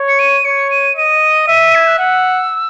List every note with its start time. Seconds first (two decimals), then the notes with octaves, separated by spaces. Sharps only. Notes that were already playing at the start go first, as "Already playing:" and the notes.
Already playing: C#5
0.08 C#7
0.19 D#7
0.45 C#5 C#7
0.71 D#7
0.97 D#5 D#7
1.48 E5
1.75 G#6
1.87 F#6
1.99 F#5 E6